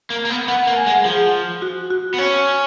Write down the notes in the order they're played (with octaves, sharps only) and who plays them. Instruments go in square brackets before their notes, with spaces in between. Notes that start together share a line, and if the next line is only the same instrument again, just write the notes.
[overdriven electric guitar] A#3
A#3
B3
[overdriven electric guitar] B3 [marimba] F#5
[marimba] F#5
[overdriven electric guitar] A#3
[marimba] G#5
[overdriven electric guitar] G#3
[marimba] F#5
[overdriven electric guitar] F3 [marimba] G#4
[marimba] F#4
F#4
[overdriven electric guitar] B3
[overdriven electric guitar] C#4 [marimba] C#5